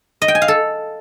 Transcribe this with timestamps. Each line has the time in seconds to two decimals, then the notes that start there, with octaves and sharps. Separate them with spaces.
0.22 D#5
0.28 G5
0.35 G#5
0.42 F5
0.48 A4